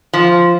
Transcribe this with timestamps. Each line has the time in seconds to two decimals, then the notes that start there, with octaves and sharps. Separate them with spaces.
0.13 F3